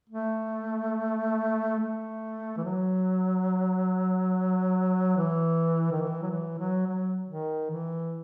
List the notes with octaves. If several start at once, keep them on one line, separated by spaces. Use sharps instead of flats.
A3
A3
E3
F#3
E3
D#3
E3
F#3
E3
F#3
F#3
D#3
E3